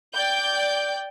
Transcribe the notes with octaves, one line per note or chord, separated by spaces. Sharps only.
D5 G5 G6